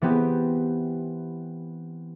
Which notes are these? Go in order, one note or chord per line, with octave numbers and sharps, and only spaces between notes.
E3 B3 C4 G4